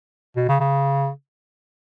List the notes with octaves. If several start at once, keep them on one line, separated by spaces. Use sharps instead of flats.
B2
C#3
C#3